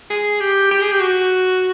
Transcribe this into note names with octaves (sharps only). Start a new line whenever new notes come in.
G#4
G4
G4
G#4
G4
F#4